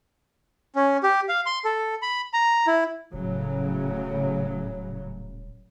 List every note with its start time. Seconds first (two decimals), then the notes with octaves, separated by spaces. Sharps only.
0.75 C#4
1.03 G4
1.29 F5
1.46 C6
1.65 A4
2.02 B5
2.33 A#5
2.67 E4
3.14 D#1 A2 C#3 F#3